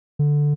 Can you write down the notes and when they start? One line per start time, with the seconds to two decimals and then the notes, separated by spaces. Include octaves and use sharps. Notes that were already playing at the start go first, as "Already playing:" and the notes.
0.19 D3